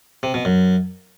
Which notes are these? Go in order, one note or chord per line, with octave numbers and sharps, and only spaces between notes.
C3
B2
F#2